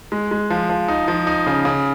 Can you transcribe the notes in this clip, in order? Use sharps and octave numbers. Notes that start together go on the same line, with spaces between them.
G#3
G#3
F3
F3
D#4
F3
D#4
C#3
C#3